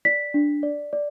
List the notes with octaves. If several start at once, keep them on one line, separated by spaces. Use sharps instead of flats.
D5 B6
D4
D5
D5